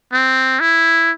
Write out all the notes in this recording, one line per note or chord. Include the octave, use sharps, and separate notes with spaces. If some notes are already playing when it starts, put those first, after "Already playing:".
C4
E4